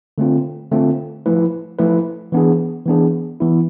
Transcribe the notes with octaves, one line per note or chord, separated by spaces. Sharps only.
D3 A3 C4 F4
D3 A3 C4 F4
F3 A3 E4 B4
F3 A3 E4 B4
E3 B3 D4 G#4
E3 B3 D4 G#4
E3 B3 E4